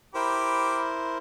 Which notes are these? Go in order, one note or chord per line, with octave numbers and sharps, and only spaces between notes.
E4 G4 A#4 C5 B5 D6